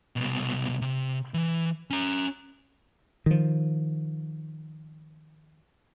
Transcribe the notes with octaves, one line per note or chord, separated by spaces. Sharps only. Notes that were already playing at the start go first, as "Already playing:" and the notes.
C2 B2
C3
E3
C#4 A#5
D#3 F3